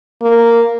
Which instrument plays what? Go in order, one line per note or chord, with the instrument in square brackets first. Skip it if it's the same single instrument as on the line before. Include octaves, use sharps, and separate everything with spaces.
[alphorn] A#3